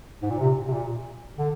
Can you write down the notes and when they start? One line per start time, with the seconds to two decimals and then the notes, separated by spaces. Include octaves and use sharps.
0.22 G#2
0.30 A#2
0.40 C3
0.68 C3
0.73 A#2
1.38 D3